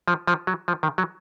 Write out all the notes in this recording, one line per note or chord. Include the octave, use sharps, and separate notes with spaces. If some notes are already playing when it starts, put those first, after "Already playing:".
F3
F3
F#3
F3
D#3
F#3